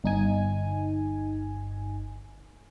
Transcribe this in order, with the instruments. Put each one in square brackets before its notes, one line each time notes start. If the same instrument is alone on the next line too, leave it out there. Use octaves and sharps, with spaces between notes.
[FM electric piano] G1 D#4 G#5